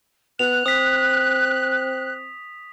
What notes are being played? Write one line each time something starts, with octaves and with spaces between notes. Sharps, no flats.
B3 F#6 F7
C4 D#6 B6